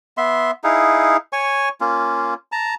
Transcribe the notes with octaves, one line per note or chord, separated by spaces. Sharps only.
B3 E5 C6
D#4 E4 G#4 F5
C#5 G#5 C#6
A#3 C#4 F4
A5 A#5